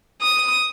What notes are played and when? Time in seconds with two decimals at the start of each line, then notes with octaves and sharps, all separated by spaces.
0.22 D#6